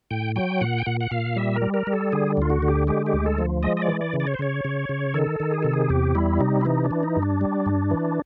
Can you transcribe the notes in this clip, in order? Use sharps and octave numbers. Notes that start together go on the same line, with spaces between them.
A2 G5
F#3 G5
A#2 F#5
G5
A#2 F#5
F#5
A#2 F5
G3 E5
A#4
G3
A#4
G3
A4
D3 G#4
D2 F4
F#4
D3
G4
G#3 G4
G4
D2
A4
F3
G#3 D#5
D#5
D5
E3
D5
C#3
D5
C#5
C5
C#3 C#5
C#3
C#3
D#3 A4
D#3
G#4
C3 A4
G#4
E2 G4
G3 E4
C3 D#4
E4
E3 D#4
D4
E3
D#4
G2
D4
G3
G2
E3